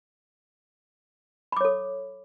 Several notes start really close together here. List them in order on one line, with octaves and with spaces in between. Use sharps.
B5 D6 C#5 A4